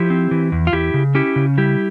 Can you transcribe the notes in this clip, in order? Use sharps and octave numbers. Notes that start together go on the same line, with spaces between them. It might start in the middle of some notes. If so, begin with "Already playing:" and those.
Already playing: F3 E4 G4
C4
E3
E2
F4
E2 E4 G4
C#3
C#4 E4 G4
C#3
G3 E4 G4